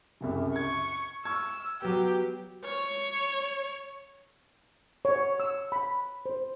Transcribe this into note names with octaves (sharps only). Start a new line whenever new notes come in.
C2 F#2 C#3
C#6 G#6
C#6 E6 F6 G#6
F#3 B3 G4
C#5
C#5
E6
B5
C5